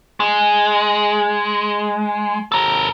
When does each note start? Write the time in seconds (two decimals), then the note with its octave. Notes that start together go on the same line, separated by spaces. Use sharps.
0.20 G#3
2.52 A4 A#4